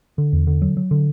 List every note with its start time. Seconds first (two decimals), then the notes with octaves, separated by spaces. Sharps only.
0.18 D3
0.33 E2
0.47 D3
0.62 F#3
0.77 F#3
0.91 D3